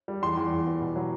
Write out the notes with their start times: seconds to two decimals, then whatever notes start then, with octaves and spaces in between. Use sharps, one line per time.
0.08 G3
0.22 E2 C6
0.37 E2
0.52 E2
0.67 B3
0.81 B2
0.96 F#3